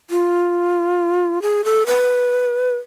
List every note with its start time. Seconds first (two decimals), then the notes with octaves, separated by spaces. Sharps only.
0.10 F4
1.42 G#4
1.64 A4
1.86 B4